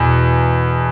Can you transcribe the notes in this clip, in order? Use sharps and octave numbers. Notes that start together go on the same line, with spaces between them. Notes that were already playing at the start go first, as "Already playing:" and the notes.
Already playing: E2 B2